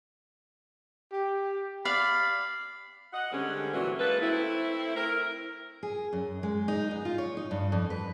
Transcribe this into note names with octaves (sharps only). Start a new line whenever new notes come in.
G4
D5 F5 B5
D#5 F#5
D3 G3 G#3 C4 C#4
A#2 E3 F#3 F#4
G#3 A#3 A4 B4
A3 C4 E4
A#4
G#4
F#2
G#3
D#4
B3
F4
C#5
D#4
G2
F2
B4